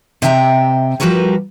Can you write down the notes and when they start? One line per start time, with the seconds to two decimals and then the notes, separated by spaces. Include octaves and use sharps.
0.22 C3 D#5 E5 G5 G#5 A#5
1.00 G2 F3 G3 F#4 A#4 B4